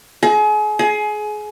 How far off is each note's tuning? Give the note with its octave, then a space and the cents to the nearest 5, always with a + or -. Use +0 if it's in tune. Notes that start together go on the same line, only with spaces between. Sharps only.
G#4 +35
G#4 +25